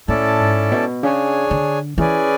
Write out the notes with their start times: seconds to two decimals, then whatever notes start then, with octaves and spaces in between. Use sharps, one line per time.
0.08 A2 C#4 E4 A4 D5 A5
0.40 G#2
0.72 B2
1.03 C#3 D4 G#4 C#5 G#5
1.51 D3
1.98 E3 C#4 G#4 B4 D5 G#5